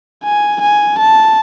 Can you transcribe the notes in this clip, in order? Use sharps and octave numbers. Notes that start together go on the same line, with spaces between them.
G#5
G#5
A5